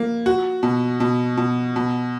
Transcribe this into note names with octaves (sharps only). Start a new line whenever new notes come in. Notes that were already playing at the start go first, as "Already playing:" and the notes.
Already playing: A#3
F#4
B2
B2
B2
B2